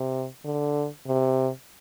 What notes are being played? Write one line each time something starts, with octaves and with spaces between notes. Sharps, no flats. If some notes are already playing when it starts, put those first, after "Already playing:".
Already playing: C3
D3
C3